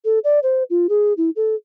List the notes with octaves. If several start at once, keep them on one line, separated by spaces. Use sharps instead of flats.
A4
D5
C5
F4
G#4
E4
A4